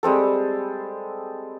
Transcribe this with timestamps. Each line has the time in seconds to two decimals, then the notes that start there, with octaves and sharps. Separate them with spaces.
0.03 G3 G#3 C4 A4